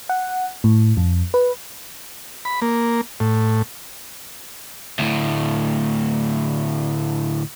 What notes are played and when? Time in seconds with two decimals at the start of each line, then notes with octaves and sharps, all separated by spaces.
0.09 F#5
0.64 A2
0.97 F2
1.34 B4
2.45 B5
2.62 A#3
3.20 A2
4.99 D2 A2